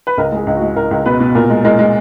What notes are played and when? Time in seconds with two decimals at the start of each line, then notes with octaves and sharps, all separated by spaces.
0.07 B4
0.18 C#2 A#4
0.32 G#3
0.37 G#4
0.47 C#2
0.57 F#4
0.61 G#3
0.76 C#2 A#4
0.91 C#2
1.06 B2 B4
1.20 B2
1.35 A#2 A#4
1.50 G#3
1.64 G#3 A#4
1.79 G#3